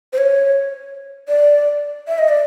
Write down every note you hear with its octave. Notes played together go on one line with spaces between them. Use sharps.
C5
C#5
D5
E5
D#5
D5